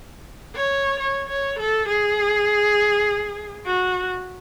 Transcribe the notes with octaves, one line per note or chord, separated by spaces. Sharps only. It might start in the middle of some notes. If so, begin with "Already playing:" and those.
C#5
C#5
C#5
A4
G#4
F#4